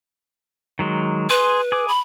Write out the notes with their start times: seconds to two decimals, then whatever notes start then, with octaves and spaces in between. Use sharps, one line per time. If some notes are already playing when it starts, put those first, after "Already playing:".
0.79 D#3 F#3 G#3
1.30 G#4 B4 C6
1.72 G#4 D6
1.88 B5